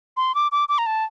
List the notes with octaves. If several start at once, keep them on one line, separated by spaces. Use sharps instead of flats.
C6
D6
D6
D6
A#5
A5